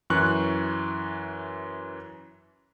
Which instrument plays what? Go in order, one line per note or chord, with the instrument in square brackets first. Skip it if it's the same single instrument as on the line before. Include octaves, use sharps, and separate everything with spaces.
[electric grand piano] F#2 E3 C#6 F#6